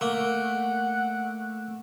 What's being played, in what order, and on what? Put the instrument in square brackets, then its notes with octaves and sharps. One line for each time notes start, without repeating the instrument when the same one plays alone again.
[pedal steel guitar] A3 [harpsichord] A#3 [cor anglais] F#5